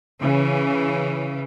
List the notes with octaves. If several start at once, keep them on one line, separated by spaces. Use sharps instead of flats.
C#3 E3